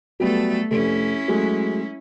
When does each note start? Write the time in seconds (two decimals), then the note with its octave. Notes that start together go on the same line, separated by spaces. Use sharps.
0.20 F#3 G3 A3 B3 A4
0.71 F1 A3 C#4 E4
1.28 F#3 G#3 A3